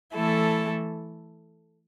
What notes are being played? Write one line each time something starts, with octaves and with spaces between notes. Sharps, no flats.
E3 A3 E4 A4